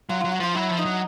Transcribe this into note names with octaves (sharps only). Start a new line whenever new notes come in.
F#3 F4
F#3 F4
F#4
F3 F4
F#3 E4
F3
D#4
F#3